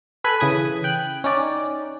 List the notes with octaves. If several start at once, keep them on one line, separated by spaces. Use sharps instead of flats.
A4 B4 G#5 B5
C#3 E3 D#6 G#6
G5 F#6
C#4 D#4 D5